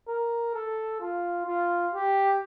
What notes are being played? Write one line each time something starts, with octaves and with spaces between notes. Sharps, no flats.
A#4
A4
F4
F4
G4